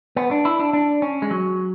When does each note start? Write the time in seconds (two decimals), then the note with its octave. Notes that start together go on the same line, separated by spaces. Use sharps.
0.16 B3
0.31 D4
0.45 E4
0.60 D4
0.73 D4
1.02 C#4
1.22 G#3
1.31 F#3